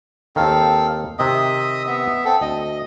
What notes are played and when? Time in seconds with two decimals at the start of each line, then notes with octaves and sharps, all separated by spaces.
0.36 D#2 D#3 C4 A4 F5
1.19 C3 D#3 D#5 E5 D#6
1.87 B3 E5
2.25 C4 A4
2.41 D2 D#5